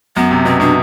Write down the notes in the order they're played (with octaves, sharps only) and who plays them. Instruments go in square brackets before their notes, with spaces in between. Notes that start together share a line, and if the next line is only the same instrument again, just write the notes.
[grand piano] F#2 [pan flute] B3
[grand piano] C3
[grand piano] B2 [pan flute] C4
[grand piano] B2 [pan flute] D4